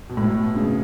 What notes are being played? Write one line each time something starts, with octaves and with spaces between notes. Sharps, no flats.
B2
A2
B2
C#3